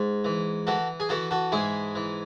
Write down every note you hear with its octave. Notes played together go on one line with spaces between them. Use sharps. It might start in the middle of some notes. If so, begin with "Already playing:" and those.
Already playing: G#2
E3
E3 F#4 A4
G#4
E3 F#4 A4
F#4 A4
G#2 E4 G#4
E3